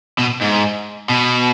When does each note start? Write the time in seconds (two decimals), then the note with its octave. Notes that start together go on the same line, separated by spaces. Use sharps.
0.18 B2
0.41 G#2
1.09 B2